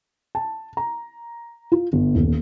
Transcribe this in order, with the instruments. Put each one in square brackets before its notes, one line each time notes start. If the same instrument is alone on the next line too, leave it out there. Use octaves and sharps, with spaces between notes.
[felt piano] A5
A#5
F4
G1
D#1